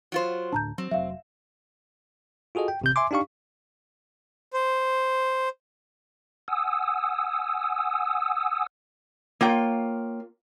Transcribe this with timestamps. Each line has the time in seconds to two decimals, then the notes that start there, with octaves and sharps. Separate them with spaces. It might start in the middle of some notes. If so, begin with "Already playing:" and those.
0.12 F#3 F4 C5
0.53 D2 A2 D4 A5 A#5 G6
0.78 F#3 C4
0.91 F1 F#3 E5 F5
2.55 F4 F#4 G#4 A4 D#5
2.68 G5
2.81 A1 C3 G6
2.96 E5 G#5 C6 D6
3.11 D4 D#4 G4 F5 C#6
4.54 C5
6.48 F#5 G#5 D#6 E6
9.41 A#3 F4 C#5 G5